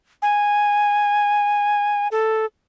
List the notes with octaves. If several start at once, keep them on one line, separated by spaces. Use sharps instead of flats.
G#5
A4